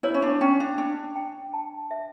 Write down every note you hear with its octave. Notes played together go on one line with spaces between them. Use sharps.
E4 C#5
C#4
D4
C#4 G5
D4
D4 G5
G5
A5
E5